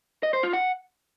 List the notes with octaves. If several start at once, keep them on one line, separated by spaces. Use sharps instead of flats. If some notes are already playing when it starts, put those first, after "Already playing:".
D#5
C5
F4
F#5